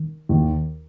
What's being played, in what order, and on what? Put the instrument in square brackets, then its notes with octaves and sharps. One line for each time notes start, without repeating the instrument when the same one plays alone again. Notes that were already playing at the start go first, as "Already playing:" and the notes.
Already playing: [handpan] D#3
[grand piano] D#2